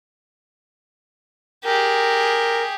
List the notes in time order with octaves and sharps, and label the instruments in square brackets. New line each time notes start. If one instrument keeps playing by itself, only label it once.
[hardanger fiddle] G4 G#4 [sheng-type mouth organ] A#4